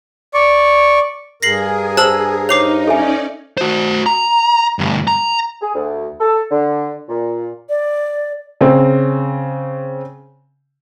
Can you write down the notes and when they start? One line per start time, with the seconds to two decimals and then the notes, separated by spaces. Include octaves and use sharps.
0.34 D5 C#6
1.43 G2 G#4 A#4 A#6 C7 F#7
1.97 C5 A5 E6 F#7
2.49 D#4 C5 C#5 D6 C7 F7
2.88 C#4 D#4 A4 D5 E5 G#5
3.58 F#4 C5
4.06 A#5
4.79 D2 G2
5.07 A#5
5.62 G#4
5.75 D2
6.20 A4
6.50 D3
7.08 A#2
7.69 D5
8.61 C#3 C4